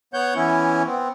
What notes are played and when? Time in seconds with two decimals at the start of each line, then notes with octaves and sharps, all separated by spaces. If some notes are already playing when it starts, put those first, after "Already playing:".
0.14 B3 C#5 F#5 G6
0.36 E3 B3 C#4 E4
0.85 B3 C4